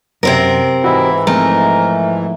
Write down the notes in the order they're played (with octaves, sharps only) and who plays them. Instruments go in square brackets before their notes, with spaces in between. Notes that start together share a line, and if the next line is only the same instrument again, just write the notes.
[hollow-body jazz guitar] F#2 [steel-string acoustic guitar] C3 C4 A#4
[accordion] G#2 E3 [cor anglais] E4 [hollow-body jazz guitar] F#4 D#5
[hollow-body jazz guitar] F3 G#3 C4 [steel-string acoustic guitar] A3 [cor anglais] A#4